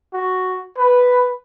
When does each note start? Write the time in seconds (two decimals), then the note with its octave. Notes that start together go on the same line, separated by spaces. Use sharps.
0.13 F#4
0.77 B4